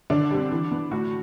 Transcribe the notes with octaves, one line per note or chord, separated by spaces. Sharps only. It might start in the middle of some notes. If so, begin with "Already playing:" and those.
D3 D4
G3 C4
E3
B3
A2 F#4